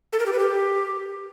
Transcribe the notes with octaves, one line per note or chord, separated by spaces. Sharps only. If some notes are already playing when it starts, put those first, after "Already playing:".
A4
A#4
G4
B4
G4